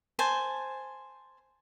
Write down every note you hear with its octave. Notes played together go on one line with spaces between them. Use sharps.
C5 G#5 A5